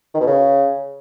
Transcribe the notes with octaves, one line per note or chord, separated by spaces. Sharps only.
D#3
B2
C#3